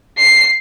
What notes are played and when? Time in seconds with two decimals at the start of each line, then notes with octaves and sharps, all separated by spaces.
0.18 C7